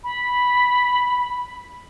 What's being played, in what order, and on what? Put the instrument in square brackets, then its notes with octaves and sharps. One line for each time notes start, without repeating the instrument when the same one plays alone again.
[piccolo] B5